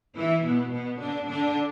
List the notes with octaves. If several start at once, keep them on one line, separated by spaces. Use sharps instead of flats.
E3 E4
B2 B3
B2 B3
D3 D4
D3 D4